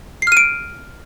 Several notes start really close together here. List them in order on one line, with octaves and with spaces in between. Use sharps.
C7 F6 D#7 D7